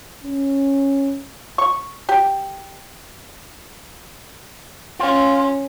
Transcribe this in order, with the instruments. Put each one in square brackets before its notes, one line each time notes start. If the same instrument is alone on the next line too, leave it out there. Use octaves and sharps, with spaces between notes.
[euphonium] C#4
[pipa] C#6
G4
[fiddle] C#4 [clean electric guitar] F4